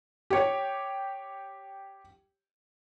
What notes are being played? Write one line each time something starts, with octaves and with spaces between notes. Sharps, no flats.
G4 C#5